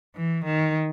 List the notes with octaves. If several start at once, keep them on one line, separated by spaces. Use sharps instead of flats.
E3
D#3